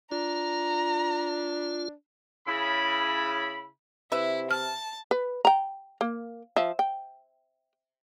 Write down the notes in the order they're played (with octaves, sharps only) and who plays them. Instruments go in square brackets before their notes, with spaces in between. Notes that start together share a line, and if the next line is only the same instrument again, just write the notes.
[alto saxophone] D4 [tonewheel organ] F4 [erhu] A#5
[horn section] C#3 E4 B5
[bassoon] C3 [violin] E4 [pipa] B4 E5
[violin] A5 [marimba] F6
[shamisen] B4
G5 A#5
A#3
F3 E5
G5